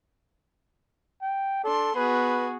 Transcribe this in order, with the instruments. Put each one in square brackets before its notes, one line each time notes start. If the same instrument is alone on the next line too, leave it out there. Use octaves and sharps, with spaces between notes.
[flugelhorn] G5
[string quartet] D4 C6 [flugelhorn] A4
[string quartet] B3 F#4 G#4 [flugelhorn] B4